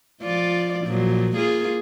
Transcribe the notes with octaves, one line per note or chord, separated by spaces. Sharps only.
F3 F4 D5
A#2 F3 F#3
A#3 F4 G#4